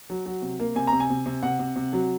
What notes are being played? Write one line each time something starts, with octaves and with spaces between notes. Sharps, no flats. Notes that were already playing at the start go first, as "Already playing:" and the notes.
F#3
F#3
C3
A#3
C3 G#5
C3 A#5
G#5
C3
C3
C3 F#5
C3
C3
F#3